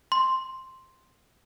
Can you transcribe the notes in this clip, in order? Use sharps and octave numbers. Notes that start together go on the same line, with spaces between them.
C6